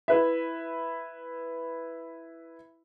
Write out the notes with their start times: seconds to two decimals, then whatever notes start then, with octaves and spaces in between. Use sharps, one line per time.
0.08 E4 B4 E5